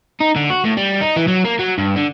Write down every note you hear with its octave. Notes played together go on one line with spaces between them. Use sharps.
D#4
D3
F#4
A2
G3
D#4
E3
F#3
A#3
F#3
G2
D3